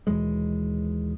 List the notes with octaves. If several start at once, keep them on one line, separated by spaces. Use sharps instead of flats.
D#2 B2 E3 G#3